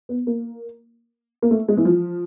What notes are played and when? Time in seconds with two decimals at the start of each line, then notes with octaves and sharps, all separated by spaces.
0.09 B3
0.27 A#3
1.42 A#3
1.51 A3
1.68 G#3
1.77 E3
1.85 F3